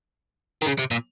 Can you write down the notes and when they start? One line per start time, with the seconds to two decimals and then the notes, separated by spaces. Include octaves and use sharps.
0.62 D#3
0.66 C#3
0.79 C3
0.91 A#2